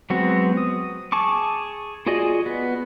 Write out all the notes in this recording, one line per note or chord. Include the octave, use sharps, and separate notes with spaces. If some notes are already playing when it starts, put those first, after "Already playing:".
F#3 G#3 B3 C4 F#4
D#6
G#4 A5 C#6 D6
F4 F#4 G#4 D5 D#5
B3